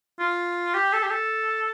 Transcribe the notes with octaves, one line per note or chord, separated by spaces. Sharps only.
F4
G4
A4
G4
A4